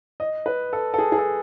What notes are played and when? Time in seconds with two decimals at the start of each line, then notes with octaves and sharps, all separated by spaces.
0.20 D#5
0.46 B4
0.73 A4
0.94 A4
0.98 G#4
1.12 G#4
1.18 A4